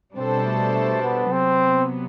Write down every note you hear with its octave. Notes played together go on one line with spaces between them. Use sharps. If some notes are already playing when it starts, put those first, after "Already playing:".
B2 G3 C4 D4 A4 C5
A3
A3
B3
C3 F#3 B3 C4